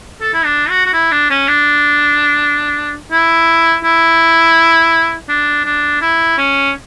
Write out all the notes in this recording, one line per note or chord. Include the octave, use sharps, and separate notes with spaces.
A4
E4
D4
F#4
F#4
E4
D4
C#4
D4
E4
E4
D4
D4
E4
C#4